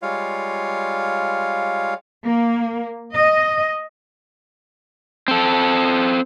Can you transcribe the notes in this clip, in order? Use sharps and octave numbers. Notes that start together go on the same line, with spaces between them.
G3 G#3 F4 C#5 F5
A#3
D#5
C4 A4